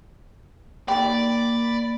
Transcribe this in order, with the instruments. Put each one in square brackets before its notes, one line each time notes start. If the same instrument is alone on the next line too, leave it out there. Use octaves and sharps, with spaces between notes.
[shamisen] D#3 G4 [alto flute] A#3 [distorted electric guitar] D5 [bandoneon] B5